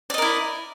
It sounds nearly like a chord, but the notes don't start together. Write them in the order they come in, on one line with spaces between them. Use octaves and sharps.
D5 D#5 A#4 E4